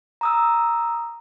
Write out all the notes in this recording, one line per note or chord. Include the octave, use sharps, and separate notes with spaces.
A#5 D#6 E6